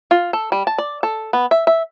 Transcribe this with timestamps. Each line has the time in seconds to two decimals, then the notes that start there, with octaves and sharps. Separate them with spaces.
0.11 F4
0.33 A4
0.52 G3
0.67 A5
0.78 D5
1.03 A4
1.33 B3
1.51 E5
1.67 E5